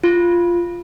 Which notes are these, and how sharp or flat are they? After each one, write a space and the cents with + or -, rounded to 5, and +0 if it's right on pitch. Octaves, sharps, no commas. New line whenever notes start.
F4 -5